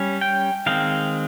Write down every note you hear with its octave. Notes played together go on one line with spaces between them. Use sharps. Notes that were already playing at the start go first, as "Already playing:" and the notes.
Already playing: G3 C#4
G5
D#3 G#3 C4 F5